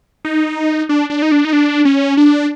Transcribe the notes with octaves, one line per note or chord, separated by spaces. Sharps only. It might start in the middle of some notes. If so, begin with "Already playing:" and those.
D#4
D4
D4
D#4
D4
D#4
D4
C#4
D4